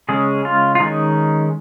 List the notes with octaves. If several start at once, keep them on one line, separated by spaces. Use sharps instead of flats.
C#3 G#3 C#4 G#4
F4
F4
D#3 G#3 C#4 D#4